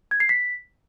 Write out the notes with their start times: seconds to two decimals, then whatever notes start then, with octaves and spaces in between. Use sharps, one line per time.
0.11 G#6
0.20 C7
0.29 B6